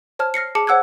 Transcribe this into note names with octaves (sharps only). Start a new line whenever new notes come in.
C5 C#5 A5 F6
F6 A#6 C7 C#7
G#4 A5 D6 C#7
C5 C#5 F#5 E6 F#6 G#6